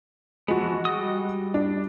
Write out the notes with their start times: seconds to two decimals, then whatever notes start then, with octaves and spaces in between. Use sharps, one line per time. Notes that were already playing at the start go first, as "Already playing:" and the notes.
0.48 E3 F3 G#3 B3 F#4
0.85 G3 D#5 D#6
1.54 D4